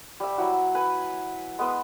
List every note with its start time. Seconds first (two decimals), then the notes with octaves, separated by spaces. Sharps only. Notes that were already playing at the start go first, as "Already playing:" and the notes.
0.20 G3 E5
0.38 F#3 E4 F#4
0.75 B4 G#5
1.58 G#3 B3 B4 E6